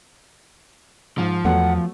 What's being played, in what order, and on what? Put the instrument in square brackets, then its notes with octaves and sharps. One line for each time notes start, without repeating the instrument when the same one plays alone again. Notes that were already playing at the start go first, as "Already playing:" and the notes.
[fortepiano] G#2 [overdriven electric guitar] F3
[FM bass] E2 [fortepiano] F#3 A3 B3 [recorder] F#5